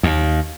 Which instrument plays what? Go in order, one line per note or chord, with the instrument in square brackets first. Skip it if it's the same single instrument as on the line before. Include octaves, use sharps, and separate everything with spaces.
[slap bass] D#2